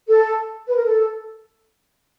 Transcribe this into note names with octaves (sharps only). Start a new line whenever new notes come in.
A4
B4
A#4
A4